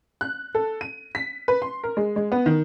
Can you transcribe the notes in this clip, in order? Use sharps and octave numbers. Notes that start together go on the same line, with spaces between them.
F#6
A4
D#7
B6
B4
C6
A#4
G#3
G#3
B3
D#3